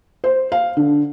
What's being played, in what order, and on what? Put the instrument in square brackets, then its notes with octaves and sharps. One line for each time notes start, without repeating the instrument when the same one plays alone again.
[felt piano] C5
F5
D3